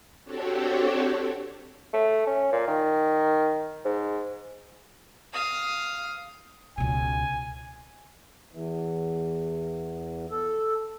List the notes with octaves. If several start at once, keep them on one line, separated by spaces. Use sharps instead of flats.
C4 D4 F#4 G4 A4 C#5
A3
C#4
A#2
D#3
G#2
F5 D#6
C#2 B2 G#5
E2
A4